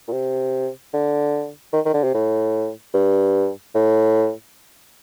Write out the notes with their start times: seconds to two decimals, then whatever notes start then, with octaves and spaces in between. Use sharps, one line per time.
0.08 A#2
0.12 C3
0.94 D3
1.73 D#3
1.86 D#3
1.93 D3
2.04 C3
2.14 A2
2.94 G2
3.75 A2